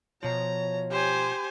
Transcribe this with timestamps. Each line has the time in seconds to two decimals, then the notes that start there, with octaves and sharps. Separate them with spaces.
0.23 B2 F3 C#5 A#5
0.91 G4 C5 G#5